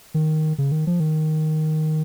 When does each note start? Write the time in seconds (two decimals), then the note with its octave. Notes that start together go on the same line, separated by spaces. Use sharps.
0.14 D#3
0.58 C#3
0.72 D#3
0.87 F3
1.00 D#3